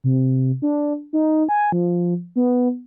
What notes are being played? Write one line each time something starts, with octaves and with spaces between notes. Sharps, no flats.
C3
D4
D#4
G#5
F3
B3